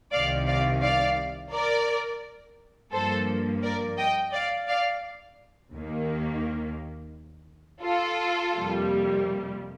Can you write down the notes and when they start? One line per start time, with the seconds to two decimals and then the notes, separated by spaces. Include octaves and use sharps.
0.12 C2 C3 D#3 D5 F5
0.47 D5 F5
0.82 D5 F5
1.52 A#4 D5
2.92 G2 F3 A#3 A4 C5
3.62 A#4 D5
3.98 D#5 G5
4.32 D5 F5
4.68 D5 F5
5.73 D#2 D#3 A#3
7.83 F4 A4
8.53 F2 C3 G3 A#3